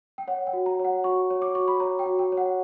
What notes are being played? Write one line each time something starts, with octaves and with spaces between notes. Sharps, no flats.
G5
C#5 F#5
G5
F#4
A#5
C#5
F#5
F#4 C#6
C#5
D6
F#4 C#6
B5
C#5 A#5
G5
F#4
G5
C#5
F#5